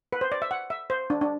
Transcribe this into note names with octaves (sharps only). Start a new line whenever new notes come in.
B4
C5
D5
E5
F#5
E5
C5
D4
D4